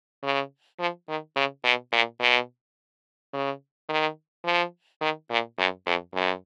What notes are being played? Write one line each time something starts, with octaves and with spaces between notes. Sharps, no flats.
C#3
F3
D#3
C#3
B2
A#2
B2
C#3
D#3
F3
D#3
A#2
F#2
F2
F#2